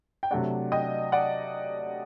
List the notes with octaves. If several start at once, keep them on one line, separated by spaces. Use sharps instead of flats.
G5
C3 F#3 A3 D4 D5 F#5
D#5 G5
D5 F#5